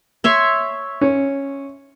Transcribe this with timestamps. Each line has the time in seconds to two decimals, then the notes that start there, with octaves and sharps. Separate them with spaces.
0.24 C#5 E5 C6
1.01 C#4